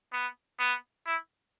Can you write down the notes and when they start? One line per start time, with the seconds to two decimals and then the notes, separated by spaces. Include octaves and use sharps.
0.12 B3
0.59 B3
1.06 E4